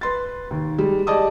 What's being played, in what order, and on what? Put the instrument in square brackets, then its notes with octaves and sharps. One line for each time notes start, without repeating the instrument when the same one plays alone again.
[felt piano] B4 C6 A6
D#2
G3 G#3
G4 G#4 D5 D#5 A5 D#6